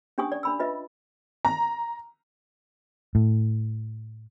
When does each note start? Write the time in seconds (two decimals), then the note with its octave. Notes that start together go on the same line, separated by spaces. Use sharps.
0.18 C#4 D4 G4 G#5 C#6 D#6
0.32 D5
0.43 D4 B5 E6
0.59 F4 B4 D#5 E5
1.45 A#5
3.15 A2